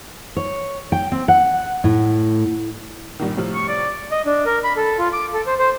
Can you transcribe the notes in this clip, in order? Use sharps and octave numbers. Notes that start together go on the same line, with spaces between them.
C#5
G5
C4
F#5
A2
G2 A#2 D#3
A2 C3 F3
C#6
D5
D#5
D4
A#4
B5
A4
F4
D6
A4
C5
C5